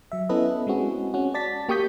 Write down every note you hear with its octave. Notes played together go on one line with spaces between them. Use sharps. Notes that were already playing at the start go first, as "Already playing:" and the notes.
F#3 E5
B3 C#4 E4 A4 B4 D#5
G#3 C4 C#4 F#4 G#4
C#4 F#4
D5 A5 A6 B6
A#3 G4 C#6 D#6 G6 B6